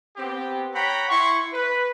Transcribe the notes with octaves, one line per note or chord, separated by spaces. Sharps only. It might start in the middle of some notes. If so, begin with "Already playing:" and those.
B3 C4 G4
C#5 F#5 G5 A#5 B5
E4 C6 C#6
B4